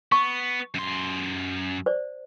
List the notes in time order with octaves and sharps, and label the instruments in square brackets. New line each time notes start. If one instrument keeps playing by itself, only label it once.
[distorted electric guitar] B3 [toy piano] C#6
[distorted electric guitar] F#2 C6
[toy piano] C5 D5